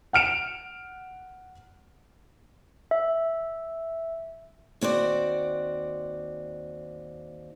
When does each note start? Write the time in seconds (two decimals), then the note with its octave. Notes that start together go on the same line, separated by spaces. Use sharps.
0.13 F#5 F6 D7 E7
2.91 E5
4.81 D#2 C4 F#4 D5